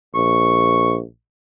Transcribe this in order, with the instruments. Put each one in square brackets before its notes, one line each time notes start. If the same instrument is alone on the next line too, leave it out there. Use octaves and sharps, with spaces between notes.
[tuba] A#1 [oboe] C#6